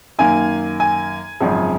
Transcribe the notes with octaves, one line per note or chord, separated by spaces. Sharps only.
F#2 D#3 A#3 G#5
G#5
G#1 F#2 C#3 F3